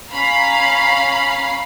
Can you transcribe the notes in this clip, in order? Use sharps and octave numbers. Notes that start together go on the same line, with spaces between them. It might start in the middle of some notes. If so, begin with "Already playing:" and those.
C#4 F5 A#5 B5 C7